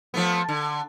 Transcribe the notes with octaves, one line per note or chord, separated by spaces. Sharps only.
F3 A3 B3
D3